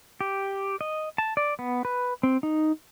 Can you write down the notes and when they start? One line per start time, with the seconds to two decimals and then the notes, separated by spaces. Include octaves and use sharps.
0.21 G4
0.81 D#5
1.18 A5
1.37 D5
1.59 B3
1.85 B4
2.23 C4
2.43 D#4